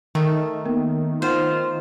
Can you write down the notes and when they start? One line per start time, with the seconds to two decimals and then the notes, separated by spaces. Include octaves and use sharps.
0.15 D#3 A3 A#4
0.66 A#3 B3 A#4
1.22 D#4 F4 C5 F#5